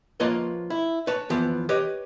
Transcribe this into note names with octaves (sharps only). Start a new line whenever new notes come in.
F3 A#3 F4 B4 C#5 D#5
E4
B4 C#5 A5
E3 F3 B3
G4 B4 C#5 D#5